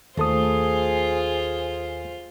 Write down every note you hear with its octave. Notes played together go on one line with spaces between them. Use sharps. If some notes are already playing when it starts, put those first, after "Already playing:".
D#2 A3 F4 G#4 A4 C5 D#6